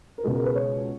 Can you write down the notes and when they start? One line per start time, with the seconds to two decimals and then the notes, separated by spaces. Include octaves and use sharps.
0.18 A#4
0.24 C#2 B2 G#3 G#4
0.35 A#4
0.45 B4
0.55 C#5